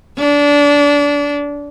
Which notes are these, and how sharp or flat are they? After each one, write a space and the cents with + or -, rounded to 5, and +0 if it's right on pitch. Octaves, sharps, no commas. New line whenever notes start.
D4 -25